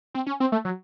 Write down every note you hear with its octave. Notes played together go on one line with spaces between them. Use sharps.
C4
C#4
C4
A3
F#3